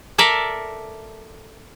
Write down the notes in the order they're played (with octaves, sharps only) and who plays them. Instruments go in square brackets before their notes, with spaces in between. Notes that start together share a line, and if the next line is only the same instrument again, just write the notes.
[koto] A4 A#4 D5 E5